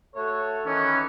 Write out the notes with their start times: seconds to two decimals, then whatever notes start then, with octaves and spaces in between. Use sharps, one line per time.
0.15 A3 F#4 A4 C#5
0.66 D#3 E3 C#4